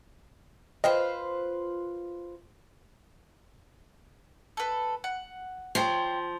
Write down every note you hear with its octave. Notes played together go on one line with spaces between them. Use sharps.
F4 B4 C5 D#5 G5
A4 B4
F#5
F3 C#5 G5 C6